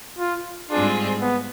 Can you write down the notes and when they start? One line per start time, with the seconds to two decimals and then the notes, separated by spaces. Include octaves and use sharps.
0.19 F4
0.70 G#2 G3 C4 D4 F4 G#4
1.21 B3